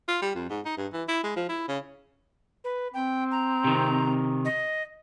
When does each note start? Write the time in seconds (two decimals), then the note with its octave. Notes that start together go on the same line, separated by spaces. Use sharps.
0.08 F4
0.22 G3
0.35 F2
0.50 G#2
0.65 D#4
0.77 G2
0.93 E3
1.08 E4
1.24 G#3
1.36 F3
1.49 E4
1.68 C#3
2.64 B4
2.94 C4 G5
3.31 A#5
3.64 C3 D#3
4.45 D#5